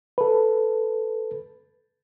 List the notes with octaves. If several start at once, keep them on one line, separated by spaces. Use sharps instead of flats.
A4 B4